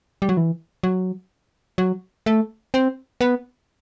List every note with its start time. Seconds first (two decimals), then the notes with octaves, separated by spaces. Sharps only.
0.22 G3
0.29 F#3
0.37 E3
0.83 F#3
1.78 F#3
2.26 A3
2.74 C4
3.21 B3